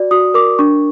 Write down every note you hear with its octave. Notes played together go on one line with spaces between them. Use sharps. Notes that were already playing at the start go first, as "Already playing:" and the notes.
Already playing: F#4 D5
F#4 D#6
A#4 D6
D4 C#6